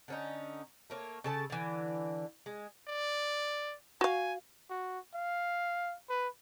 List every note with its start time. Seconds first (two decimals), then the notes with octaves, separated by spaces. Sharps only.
0.08 D3 C#4 D#4
0.90 A3 A#3 C#5
1.24 C#3 A4 A5
1.50 D3 E3
2.46 G#3
2.88 D5
4.01 F#4 F5 G#5
4.70 F#4
5.14 F5
6.10 B4